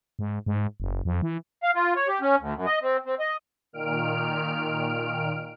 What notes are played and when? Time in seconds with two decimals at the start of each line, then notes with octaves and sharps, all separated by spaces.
0.19 G#2
0.46 G#2
0.80 F#1
1.05 F2
1.22 E3
1.63 F5
1.75 F4
1.96 C#5
2.08 G4
2.21 C#4
2.39 D2
2.54 F#2
2.66 D#5
2.82 C4
3.06 C4
3.20 D#5
3.73 A#2 D#3 F6 D7